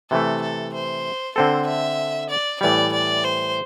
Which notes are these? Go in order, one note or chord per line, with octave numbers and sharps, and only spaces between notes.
C3 E3 A3 A4
A4
C5
D3 C4 A4 C5
E5
D5
A2 E3 G3 D5
D5
C5